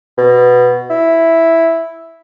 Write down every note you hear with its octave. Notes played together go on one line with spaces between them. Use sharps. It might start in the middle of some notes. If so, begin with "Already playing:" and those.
B2
E4